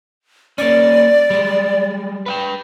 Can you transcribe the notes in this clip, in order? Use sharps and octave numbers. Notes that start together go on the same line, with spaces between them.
A#3 C#4 D5
G3 G#3
B4 F#5 G5